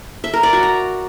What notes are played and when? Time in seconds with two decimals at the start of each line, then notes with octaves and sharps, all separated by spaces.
0.24 E5
0.33 A#4
0.43 D5
0.53 F#4
0.63 A#5